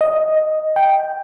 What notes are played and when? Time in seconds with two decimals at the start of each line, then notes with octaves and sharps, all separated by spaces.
0.01 D#5
0.76 G5